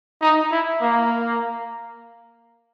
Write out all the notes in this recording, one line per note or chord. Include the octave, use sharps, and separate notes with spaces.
D#4
E4
A#3